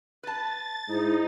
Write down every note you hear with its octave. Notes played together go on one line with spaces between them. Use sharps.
B4 A5 A6
G#2 D#4 E4